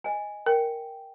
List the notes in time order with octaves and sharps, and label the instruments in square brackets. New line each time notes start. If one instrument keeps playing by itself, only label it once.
[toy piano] D#5 G#5
[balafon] A#4 [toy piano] G5